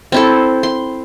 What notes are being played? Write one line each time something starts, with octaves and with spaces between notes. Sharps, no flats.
C4 E4 A4
C6